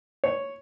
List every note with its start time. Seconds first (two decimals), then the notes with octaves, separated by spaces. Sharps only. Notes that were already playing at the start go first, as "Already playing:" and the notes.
0.24 C#5